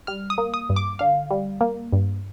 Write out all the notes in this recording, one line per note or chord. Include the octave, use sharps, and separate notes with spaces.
G3 F6
D#6
A#3
D#6
G2
D6
D3 F5
G3
A#3
G2